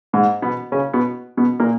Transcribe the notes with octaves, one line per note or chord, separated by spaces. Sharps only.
G#2 G#3
B2 B3
C#3 C#4
B2 B3
B2 B3
A#2 A#3